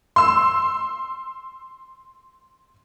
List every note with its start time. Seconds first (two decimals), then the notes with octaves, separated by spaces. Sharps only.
0.16 C6 E6